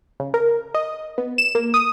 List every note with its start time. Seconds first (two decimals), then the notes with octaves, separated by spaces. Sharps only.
0.20 C#3
0.34 A#4
0.75 D#5
1.18 B3
1.38 E7
1.55 A#3
1.74 D#6